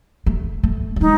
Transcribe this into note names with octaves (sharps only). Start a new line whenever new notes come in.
A3
A3
F#3
G#3 D#4